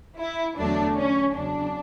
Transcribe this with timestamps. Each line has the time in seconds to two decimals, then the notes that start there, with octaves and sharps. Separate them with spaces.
0.19 E4
0.57 E2 D3 F#3 A3 D4
0.97 C#4
1.35 E2 C#3 F#3 D4